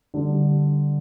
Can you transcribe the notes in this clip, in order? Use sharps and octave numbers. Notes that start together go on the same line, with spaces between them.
D3 G3